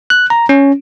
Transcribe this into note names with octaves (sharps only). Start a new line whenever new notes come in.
F#6
A#5
C#4